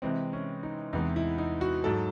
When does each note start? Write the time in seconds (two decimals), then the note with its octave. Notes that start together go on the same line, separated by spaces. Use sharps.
0.02 C3 E3 G#3 C4
0.33 C#4
0.63 D#4
0.93 E2 C3 E3 G#3 D#4
1.16 E4
1.38 D#4
1.61 F#4
1.84 G#2 F#3 A4